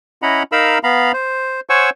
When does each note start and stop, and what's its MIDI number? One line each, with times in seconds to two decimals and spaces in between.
0.22 0.43 61
0.22 0.43 64
0.22 0.43 75
0.22 0.43 78
0.22 0.43 82
0.22 0.43 83
0.52 0.78 63
0.52 0.78 70
0.52 0.78 77
0.52 0.78 82
0.52 0.78 83
0.52 0.78 88
0.83 1.12 59
0.83 1.12 77
0.83 1.12 82
0.83 1.12 83
1.13 1.60 72
1.70 1.90 72
1.70 1.90 73
1.70 1.90 78
1.70 1.90 80
1.70 1.90 85
1.70 1.90 88